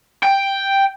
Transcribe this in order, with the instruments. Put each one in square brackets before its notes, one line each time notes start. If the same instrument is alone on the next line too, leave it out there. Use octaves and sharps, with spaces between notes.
[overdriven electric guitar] G5